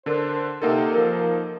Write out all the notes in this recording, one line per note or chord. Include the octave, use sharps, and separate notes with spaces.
D3 D4 A#4 C5 A5
C3 A#3 D#4 A4 A#4 F#5
F3 A#4